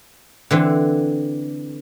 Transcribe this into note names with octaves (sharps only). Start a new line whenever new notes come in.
D3 E3 C4